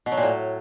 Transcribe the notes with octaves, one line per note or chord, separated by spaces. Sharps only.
B2
F#3
A#2
A2